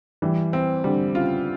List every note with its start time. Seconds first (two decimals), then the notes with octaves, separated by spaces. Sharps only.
0.22 E3 G3
0.53 C4
0.84 D3 G3
1.15 C#3 F4